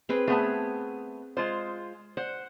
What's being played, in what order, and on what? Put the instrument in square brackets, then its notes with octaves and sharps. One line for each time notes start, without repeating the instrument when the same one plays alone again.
[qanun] C4 G#4 B4
[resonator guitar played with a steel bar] A3 B3 A5 [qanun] G#4
[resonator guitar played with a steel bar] G#3 F4 C5
[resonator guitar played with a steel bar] C5 [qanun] F#5